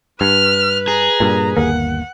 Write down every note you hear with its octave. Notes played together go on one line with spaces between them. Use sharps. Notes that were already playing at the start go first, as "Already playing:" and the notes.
G2 B4 F6
G#4 A#5
G2 A#2
G1 D#2 A#3 F#5